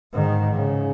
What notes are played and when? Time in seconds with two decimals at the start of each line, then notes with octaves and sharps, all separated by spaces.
0.14 G#2 D#3
0.54 C#3